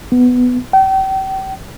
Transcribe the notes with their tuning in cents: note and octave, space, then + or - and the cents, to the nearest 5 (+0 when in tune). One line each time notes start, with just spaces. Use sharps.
B3 +10
G5 -35